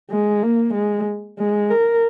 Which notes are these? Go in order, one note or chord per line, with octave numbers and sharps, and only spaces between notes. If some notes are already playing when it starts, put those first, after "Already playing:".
G#3
A#3
G#3
G#3
A#4